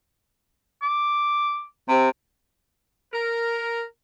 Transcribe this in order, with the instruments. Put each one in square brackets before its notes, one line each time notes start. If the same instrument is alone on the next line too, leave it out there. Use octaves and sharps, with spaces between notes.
[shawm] D6
[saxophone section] C3 C4
[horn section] A#4